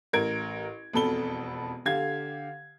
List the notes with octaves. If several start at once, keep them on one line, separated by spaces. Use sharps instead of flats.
A1 A#4 G#6 D7
E1 F2 B2 A4 B5 G7
D3 G4 F5 G#6